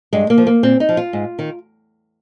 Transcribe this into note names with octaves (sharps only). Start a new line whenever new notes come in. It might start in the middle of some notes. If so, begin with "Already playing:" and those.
G2 G#3
A#3
F3
A#3
A#2 C4
D#4
F3
F4
G#2
D#3